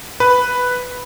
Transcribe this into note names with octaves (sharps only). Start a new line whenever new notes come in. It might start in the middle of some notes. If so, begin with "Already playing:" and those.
B4